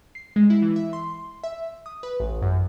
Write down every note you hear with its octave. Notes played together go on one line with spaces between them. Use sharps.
C7
G#3
E4
E3
E5
C6
E5
D#6
B4
A1
F#2